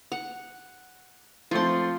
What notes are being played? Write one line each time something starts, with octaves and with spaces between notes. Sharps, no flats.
F#5
F3 A3 C4 F4 C6